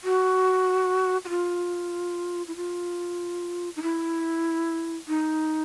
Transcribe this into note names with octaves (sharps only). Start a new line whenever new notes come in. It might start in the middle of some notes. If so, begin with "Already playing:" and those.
F#4
F#4
F4
E4
F4
D#4
E4
D#4